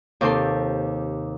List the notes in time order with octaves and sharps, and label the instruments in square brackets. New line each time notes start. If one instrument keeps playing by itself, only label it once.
[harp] D#2 C3 C4 A4 C6